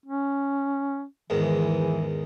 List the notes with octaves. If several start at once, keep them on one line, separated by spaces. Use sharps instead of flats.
C#4
E2 G#2 D#3 E3